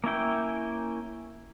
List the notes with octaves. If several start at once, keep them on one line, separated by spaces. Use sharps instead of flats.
A#3 C#4 E4 G5